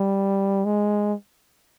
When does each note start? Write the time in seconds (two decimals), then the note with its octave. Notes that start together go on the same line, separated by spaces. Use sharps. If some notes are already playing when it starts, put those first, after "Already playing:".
Already playing: G3
0.65 G#3